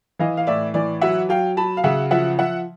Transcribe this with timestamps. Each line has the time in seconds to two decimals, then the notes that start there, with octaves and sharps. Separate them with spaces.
0.19 E3 D#5 F5
0.37 F5
0.47 A2 D5 E5
0.74 E3 D5
1.01 F#3 E5 F#5
1.29 F#3 F5 G5
1.57 F#3 A5 B5
1.77 F5
1.84 C#3 E5 F#5
2.11 F3 E5 F#5
2.38 F3 E5 F#5